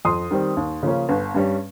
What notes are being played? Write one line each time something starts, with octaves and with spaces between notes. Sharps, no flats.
F2 C6 D#6
D#3 G3 C4
D#2
C#3 F3 A#3 C#4
G1
G2 G3 C#4